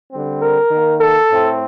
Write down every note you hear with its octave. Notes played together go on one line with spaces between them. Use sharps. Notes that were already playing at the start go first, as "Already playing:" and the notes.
D3 G3 C4
A#4
D#3
A#3
A4
A2 A3 C4